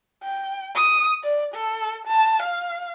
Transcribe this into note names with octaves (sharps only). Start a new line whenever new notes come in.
G5
D#6
D5
A4
A5
F5